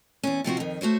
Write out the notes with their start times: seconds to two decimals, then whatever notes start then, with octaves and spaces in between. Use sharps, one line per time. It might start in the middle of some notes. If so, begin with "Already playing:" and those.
0.23 E2 C#4
0.44 C3 F3 C4 F#4
0.57 F2 D#3
0.81 A3 F#4 C5 C#5